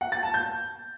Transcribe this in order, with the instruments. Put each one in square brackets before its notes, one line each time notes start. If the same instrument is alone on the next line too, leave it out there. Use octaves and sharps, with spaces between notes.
[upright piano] F#5
A6
A5
G6